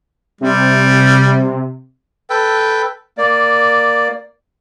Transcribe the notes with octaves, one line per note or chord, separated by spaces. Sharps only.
C3 G3
A4 B4 G5
A#3 D5